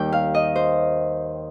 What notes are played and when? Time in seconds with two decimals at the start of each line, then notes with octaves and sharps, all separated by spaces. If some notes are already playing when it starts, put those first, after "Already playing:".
Already playing: D#2 D#3 G3 G5
0.12 F5
0.34 D#5
0.56 C5